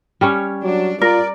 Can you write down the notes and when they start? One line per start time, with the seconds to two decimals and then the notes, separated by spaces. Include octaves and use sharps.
0.21 G3 C#4 C#5
0.63 F#3 D4
1.02 F4 A#4 D5